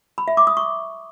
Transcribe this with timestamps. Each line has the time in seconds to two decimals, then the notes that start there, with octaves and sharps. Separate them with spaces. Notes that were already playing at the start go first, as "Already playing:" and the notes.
0.18 B5
0.28 E5
0.37 D6
0.47 D#6
0.57 C#6